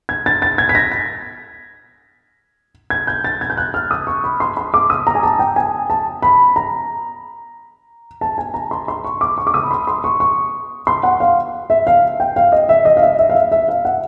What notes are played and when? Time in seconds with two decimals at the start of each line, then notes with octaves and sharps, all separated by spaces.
0.09 G#6
0.26 A6
0.42 A6
0.58 G#6
0.69 B6
0.75 A#6
0.92 B6
2.90 G#6
3.07 G6
3.24 A6
3.41 G#6
3.50 G6
3.57 F#6
3.74 F6
3.91 D#6
4.07 C#6
4.24 B5
4.40 C6
4.57 C6
4.74 D6
4.90 D#6
5.07 A#5
5.15 G#5
5.23 A5
5.39 G5
5.56 G#5
5.90 A5
6.22 B5
6.56 A#5
8.21 A5
8.38 G#5
8.54 A#5
8.71 C6
8.88 C6
9.05 C#6
9.21 D6
9.38 C#6
9.47 D6
9.54 D#6
9.63 B5
9.71 C6
9.87 C6
10.04 C#6
10.20 C#6
10.87 C6
11.03 F#5
11.20 F5
11.70 E5
11.87 F5
12.20 G5
12.36 F5
12.52 D#5
12.69 E5
12.85 D#5
12.97 F5
13.02 E5
13.19 E5
13.30 F5
13.35 E5
13.52 E5
13.69 F5
13.85 F#5